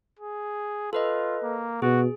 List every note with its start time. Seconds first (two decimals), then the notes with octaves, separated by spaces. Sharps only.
0.19 G#4
0.93 F4 A4 B4 D#5
1.43 A#3
1.82 B2 F#4 G#4